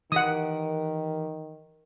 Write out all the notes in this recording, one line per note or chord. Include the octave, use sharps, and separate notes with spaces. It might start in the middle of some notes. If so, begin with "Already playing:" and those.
D#3 E3 G4 A#4 F#5 D#6